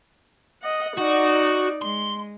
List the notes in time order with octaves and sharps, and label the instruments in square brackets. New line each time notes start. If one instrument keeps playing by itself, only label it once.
[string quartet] D#5 F#5
[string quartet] D#4 D5 [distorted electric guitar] F#4
[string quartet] G#3 [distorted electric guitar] C6